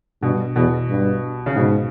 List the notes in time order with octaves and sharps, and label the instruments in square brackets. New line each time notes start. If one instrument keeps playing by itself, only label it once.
[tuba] G2 [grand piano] B2
[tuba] E2 [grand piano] B2
[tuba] G2
[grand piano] C#3
[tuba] G#2 [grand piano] B2